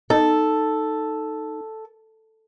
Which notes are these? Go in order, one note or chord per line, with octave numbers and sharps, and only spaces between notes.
D#4 A4